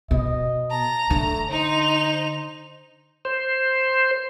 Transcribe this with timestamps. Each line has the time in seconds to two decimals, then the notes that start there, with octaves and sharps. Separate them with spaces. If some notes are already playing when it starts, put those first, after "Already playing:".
0.11 B2 D#5
0.71 A5 A#5
1.10 D3 A3
1.50 D#4 C5 F7
3.25 C5